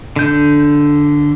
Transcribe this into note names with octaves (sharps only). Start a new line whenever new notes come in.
D3 G6